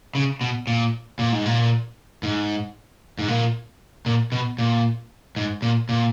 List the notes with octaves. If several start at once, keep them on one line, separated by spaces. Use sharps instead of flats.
C#3
B2
A#2
A#2
G#2
A#2
G#2
G#2
A#2
A#2
B2
A#2
G#2
A#2
A#2